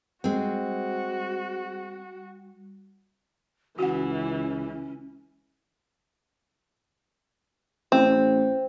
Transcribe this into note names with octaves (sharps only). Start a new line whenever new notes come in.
G3 G#3 C4 F#4
C#2 E3 C#4 F#4 F#5
A1 C4